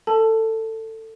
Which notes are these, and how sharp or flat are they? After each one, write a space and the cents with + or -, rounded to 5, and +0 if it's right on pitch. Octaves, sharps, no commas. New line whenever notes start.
A4 +20 A5 +0